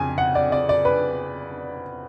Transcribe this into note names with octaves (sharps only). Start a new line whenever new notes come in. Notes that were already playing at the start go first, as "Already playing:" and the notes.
Already playing: F2 C#3 G#5
F#5
D5
D5
D5
B4